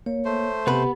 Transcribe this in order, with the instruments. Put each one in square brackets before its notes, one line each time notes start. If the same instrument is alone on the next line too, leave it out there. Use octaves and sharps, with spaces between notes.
[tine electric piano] A#3 [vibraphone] C#5
[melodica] A3 C5
[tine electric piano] C3 [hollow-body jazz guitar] B3 B4 [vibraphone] G4